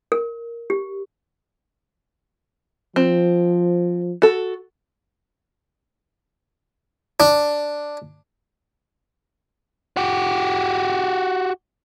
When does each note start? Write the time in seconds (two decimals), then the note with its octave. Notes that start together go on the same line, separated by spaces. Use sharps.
0.12 A#4
0.70 G4
2.96 F3 C4
4.22 F#4 A4
7.20 D4
9.97 F#4 G4